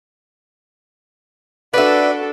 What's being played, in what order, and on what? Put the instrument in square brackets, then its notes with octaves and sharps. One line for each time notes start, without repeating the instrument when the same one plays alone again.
[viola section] D4 A4 [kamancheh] F#4 [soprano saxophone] B4 [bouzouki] D5 E5